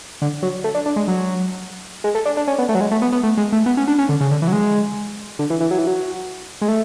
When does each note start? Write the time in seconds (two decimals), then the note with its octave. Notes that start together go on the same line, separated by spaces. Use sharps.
0.22 D3
0.42 F#3
0.64 A3
0.75 D4
0.86 D4
0.96 G#3
1.08 F#3
2.04 G#3
2.15 A3
2.25 D4
2.37 D4
2.47 C#4
2.58 B3
2.69 A3
2.75 F#3
2.81 G#3
2.91 A3
3.02 B3
3.12 B3
3.23 A3
3.37 G#3
3.52 A3
3.66 B3
3.77 C#4
3.88 D4
3.99 C#4
4.09 D3
4.21 C#3
4.31 D3
4.42 E3
4.48 F#3
4.53 G#3
5.39 D3
5.50 E3
5.60 E3
5.71 F#3
5.79 E3
5.87 F#3
6.62 G#3
6.68 A3